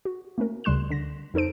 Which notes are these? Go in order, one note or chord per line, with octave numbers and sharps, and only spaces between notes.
F#4
A3 A#3 C#4 A#4
D2 C#3 G3 C6 F#6 E7
D3 A#6
F2 D#4 A4 C5 D7